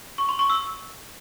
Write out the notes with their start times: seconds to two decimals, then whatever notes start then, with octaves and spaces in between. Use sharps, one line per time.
0.18 C#6
0.29 C6
0.39 C#6
0.50 E6